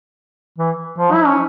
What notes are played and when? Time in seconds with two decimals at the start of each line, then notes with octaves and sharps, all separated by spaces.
0.58 E3
0.98 F3
1.13 E4
1.26 C#4